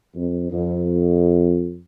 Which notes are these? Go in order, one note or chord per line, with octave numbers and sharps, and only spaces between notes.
F2
F2